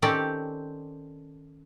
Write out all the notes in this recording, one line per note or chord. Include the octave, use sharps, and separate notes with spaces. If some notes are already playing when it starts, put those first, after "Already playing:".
D#3 C4 C#4 G4 A4 D5